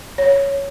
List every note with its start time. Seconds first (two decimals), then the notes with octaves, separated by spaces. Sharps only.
0.18 C#5